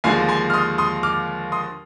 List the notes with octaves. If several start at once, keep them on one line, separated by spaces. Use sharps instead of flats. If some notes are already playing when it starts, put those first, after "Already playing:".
D#2 D3 F3 G#3 F5 G#5
G#5 C6
F6
C6 D#6
C6 D#6
D6 F6
C6 D#6